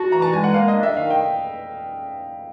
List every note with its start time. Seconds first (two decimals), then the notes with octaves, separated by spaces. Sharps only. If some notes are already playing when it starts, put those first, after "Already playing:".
Already playing: F#4 A5
0.12 E3 A#5
0.22 A5
0.33 G#3 G#5
0.44 F#5
0.54 A#3 F5
0.68 D#5
0.75 D4
0.83 E5
0.97 D#3 F5
1.10 G5